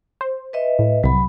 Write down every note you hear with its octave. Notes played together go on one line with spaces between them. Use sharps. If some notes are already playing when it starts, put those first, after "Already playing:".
C5
B4 D#5 E5
A2
C2 F#3 B5